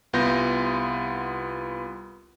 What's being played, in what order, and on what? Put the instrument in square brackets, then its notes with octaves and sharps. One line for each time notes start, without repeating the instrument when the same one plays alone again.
[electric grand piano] C2 B3 F4 G6 A#6